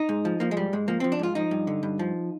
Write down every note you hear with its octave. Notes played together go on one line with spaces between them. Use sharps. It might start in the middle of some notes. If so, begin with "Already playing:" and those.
Already playing: D#4
G#2
F3
F3 A#3
G#3
G#2 G3
G#2 G#3
F3 A#3
F3 C4
D4
G#2 F4
F3 D#4
G2
D3
G2
F3